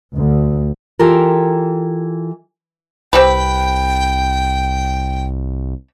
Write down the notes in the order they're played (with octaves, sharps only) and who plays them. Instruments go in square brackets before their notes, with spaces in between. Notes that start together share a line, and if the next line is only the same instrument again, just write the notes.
[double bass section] D2
[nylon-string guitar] E3 F4 G4 A4 A#4
[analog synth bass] C2 [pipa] C4 G4 B4 [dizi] G5